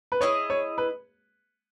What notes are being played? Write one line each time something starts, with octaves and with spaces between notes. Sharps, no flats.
B4
E4 G#4 C#5 D#5
C#5
B4